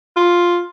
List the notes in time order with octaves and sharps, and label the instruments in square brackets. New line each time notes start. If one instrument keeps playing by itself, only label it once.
[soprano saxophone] F4